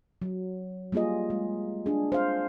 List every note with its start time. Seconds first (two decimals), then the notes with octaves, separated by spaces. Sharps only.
0.22 F#3
0.92 G3 A#3 F4 G#4 D#5
1.30 G#3
1.86 D4 G#4
2.12 C5 F5